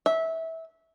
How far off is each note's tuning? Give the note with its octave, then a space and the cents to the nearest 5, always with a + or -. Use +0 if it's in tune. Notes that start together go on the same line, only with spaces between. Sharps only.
E5 -20